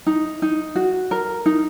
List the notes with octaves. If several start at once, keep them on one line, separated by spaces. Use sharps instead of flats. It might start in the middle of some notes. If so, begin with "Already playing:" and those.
D#4
D#4
F#4
A#4
D#4